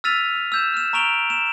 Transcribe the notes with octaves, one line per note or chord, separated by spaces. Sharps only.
E6 F6 A6 B6 D#7 F7
E6
E6 G6 E7
F6 E7
A#5 C#6 D7 F7 G7
E7